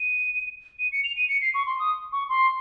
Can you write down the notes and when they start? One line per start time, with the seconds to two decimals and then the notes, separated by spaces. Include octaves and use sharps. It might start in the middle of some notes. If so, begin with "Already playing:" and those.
Already playing: D#7
0.79 D#7
0.92 C#7
1.04 F7
1.17 D#7
1.29 C#7
1.42 C7
1.54 C#6
1.66 C6
1.79 D#6
2.12 C#6
2.29 C6